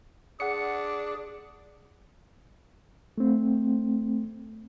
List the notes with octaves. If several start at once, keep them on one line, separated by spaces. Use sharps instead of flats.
D4 G#4 F#5 C#7
A3 C4